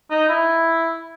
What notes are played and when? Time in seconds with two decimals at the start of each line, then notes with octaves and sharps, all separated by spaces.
0.11 D#4
0.29 E4